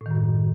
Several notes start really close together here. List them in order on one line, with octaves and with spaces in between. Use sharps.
A2 D#3 F#2